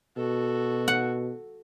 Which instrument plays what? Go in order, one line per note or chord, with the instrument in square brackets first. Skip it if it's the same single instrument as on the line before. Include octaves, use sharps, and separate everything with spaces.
[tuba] B2 [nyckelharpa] F#4 A4
[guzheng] F#5